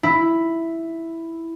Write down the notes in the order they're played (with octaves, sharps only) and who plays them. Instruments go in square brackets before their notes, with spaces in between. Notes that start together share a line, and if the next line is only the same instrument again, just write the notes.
[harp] E4